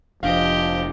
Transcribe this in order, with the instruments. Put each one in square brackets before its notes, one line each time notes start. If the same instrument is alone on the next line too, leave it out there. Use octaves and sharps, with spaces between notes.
[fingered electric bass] F1 D4 [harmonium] F3 [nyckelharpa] G4 D#5 [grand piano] F5